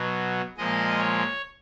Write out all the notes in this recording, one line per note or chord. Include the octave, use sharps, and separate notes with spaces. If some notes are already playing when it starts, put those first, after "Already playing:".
Already playing: B2 F#3
A#2 F3 G#3 D#5
C#5